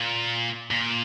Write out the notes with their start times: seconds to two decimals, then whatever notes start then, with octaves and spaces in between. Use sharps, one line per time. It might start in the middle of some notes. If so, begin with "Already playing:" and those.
Already playing: A#2
0.71 A#2